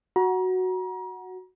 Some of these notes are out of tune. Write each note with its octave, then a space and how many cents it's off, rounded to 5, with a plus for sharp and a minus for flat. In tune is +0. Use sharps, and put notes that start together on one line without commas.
F#4 +0 A#5 +35